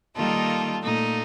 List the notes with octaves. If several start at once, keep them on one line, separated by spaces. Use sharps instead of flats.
D#3 G3 A#3 D#4 F4 A4
A#2 A3 D#4